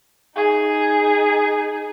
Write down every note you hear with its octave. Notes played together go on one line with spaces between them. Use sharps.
D#4 G#4